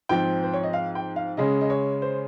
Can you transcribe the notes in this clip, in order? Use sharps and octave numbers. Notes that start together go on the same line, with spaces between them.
G#2 F3 C4 G5
C5
C#5
D#5
F5
G5
F5
C#3 G#3 C#4 D#5
D#5
C#5
C5